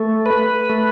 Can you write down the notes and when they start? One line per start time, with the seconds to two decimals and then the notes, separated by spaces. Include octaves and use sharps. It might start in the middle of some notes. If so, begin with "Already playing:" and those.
Already playing: A3
0.26 B4
0.70 A3